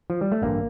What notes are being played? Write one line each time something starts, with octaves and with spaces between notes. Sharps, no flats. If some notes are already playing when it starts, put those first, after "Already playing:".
F3
G3
A3
A1 G2 D3 A#3